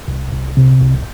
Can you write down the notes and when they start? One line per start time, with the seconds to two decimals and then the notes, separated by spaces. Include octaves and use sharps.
0.08 C2
0.33 C2
0.57 C3
0.81 C2